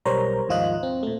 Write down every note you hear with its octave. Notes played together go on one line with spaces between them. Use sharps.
B1 G3 A#4 C5 C#5 A#5
D#2 G#2 F3 F4 D#5 F#6
C4
A#2 A3